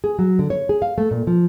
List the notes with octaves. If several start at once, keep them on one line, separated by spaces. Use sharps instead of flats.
G#4
F#3
D3
C#5
G#4
F5
A3
A#2
F3